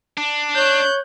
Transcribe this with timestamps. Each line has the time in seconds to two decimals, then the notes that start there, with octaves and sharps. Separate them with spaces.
0.18 D4
0.55 C#5 F#6 G6